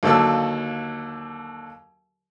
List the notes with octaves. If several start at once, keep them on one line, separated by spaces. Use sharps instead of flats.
D#2 D3 F#3 A4 F5 E6